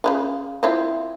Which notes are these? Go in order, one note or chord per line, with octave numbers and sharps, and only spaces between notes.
C#3 E3 F4
C4 E4 F4